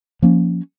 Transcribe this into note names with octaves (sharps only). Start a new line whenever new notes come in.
F3 A#3 C#4